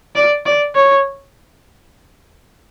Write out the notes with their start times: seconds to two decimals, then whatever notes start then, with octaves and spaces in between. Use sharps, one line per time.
0.16 D5
0.46 D5
0.76 C#5